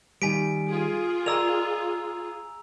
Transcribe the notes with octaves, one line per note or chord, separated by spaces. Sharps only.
D#3 G3 G#5 B6 D7
F4 G#4
A#4 D5 D#5 A#5 E6 F7